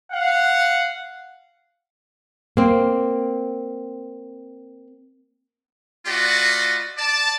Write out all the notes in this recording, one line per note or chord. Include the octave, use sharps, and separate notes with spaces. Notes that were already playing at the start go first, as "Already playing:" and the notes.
F5 F#5
A#3 C4
A3 F4 F#4 D5 D#5 B5
D5 A5